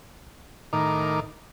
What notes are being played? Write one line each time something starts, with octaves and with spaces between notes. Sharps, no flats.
A2 D#3 D#4 A#4 D6